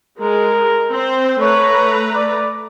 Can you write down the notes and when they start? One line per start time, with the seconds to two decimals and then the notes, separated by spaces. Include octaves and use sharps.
0.20 G#3 A#4
0.91 C4 C5
1.40 A3 B4 C#5 A#5
2.15 D5